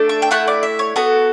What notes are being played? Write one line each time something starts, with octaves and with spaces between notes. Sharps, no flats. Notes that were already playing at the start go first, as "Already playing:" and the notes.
Already playing: A3 D4 A4
E5
G5
A3 E4 A4 F#5
D5
E5
C#5
B3 F#4 A4